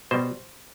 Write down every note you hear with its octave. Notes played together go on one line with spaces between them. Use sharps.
B2 G3 C5